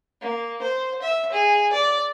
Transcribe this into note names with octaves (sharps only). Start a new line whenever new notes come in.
A#3
C5
E5
G#4
D5